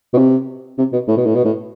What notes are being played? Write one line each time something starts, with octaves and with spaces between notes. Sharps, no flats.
B2
C3
C3
B2
A2
B2
A2
B2
A2